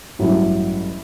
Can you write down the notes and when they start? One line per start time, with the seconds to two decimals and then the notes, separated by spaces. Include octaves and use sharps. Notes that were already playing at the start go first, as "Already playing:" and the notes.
0.19 A1 G2 F#3 E4